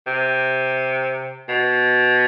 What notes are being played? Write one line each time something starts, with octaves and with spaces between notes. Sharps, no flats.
C3
B2